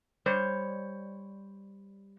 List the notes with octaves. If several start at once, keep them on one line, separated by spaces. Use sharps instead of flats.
G3 C5 C#5